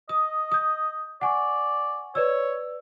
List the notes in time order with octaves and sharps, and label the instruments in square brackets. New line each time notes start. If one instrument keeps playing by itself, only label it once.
[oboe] D#5 [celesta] D#6
[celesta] D#6 G6
[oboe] D5 [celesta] F#5 G#5 C#6
[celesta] B4 D5 E6 [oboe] C#5